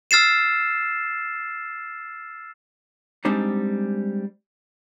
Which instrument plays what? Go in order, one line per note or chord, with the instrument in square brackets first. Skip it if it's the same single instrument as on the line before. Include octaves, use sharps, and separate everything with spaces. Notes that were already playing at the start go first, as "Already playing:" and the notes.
[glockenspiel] E6 F6 A6 C7 E7
[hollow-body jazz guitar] G3 G#3 C4 D4 D#4